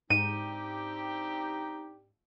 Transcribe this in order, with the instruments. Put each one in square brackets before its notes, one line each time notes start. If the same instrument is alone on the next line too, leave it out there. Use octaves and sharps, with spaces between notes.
[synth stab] G#2 [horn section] C4 D4 G4 [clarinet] D#4 [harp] D#7